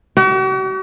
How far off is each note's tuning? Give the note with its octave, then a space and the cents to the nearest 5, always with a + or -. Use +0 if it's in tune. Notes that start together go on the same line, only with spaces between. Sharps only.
F#4 +45